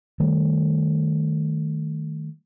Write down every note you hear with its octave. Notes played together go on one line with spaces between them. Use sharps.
D#3 G3 A3